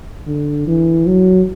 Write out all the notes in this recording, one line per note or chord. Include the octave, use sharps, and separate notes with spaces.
D3
E3
F#3